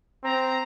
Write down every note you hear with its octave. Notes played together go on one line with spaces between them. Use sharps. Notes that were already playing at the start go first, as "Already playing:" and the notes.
C4 A#5